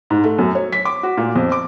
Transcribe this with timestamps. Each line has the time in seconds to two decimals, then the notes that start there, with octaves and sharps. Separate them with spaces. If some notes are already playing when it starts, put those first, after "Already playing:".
0.10 G#2
0.24 A3
0.39 F#2
0.55 C#5
0.72 B6
0.85 D6
1.03 F#4
1.17 A#2
1.36 F2
1.52 D6